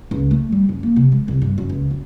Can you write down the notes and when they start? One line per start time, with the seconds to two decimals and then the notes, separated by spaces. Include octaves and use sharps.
0.11 C#2
0.31 A3
0.52 G3
0.69 F#2
0.83 A#3
0.96 C3
1.12 G#3
1.28 C2
1.42 G2
1.58 F#2
1.70 C#2
1.91 F#2